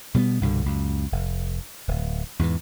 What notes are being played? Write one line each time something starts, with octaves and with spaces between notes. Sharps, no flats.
B2 G3 A3 B3
C2 G2 B2 D3
C#2 F#2
F1
D1
E2 G#2 C#3 E3